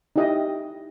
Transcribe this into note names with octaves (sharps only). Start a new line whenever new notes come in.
D#4 E4 G4 D#5 E5 G5